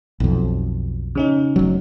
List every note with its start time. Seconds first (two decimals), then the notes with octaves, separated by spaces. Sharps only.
0.20 B1 F2
1.15 C#3 C#4 D#4
1.56 F1 F#3